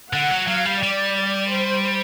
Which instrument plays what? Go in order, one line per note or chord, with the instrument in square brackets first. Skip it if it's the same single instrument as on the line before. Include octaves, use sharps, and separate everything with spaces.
[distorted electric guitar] D3 [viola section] F#5
[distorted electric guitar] F#3
[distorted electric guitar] F#3 [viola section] F5
[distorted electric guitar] G3
[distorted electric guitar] G3 [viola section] D5
[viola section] D5
C5